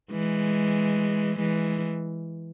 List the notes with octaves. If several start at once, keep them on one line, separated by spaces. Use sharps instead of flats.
E3 G#3
E3 G#3